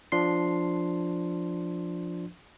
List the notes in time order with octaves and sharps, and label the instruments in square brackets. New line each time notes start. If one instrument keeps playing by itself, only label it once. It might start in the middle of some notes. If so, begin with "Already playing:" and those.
[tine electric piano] F3 D4 C6 C7